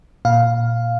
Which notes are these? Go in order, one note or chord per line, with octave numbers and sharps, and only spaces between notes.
A#2 F5